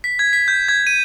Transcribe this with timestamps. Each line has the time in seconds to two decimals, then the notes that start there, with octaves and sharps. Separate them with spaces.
0.04 B6
0.19 G#6
0.33 B6
0.48 G6
0.69 G#6
0.87 D#7